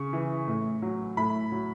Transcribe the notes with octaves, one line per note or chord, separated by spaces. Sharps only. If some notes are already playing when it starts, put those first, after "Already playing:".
Already playing: C#3 C#6
E3
A2
F#3
A2 B5
F#3